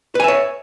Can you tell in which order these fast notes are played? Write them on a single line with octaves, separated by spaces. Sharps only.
B4 G#5 E5 C#5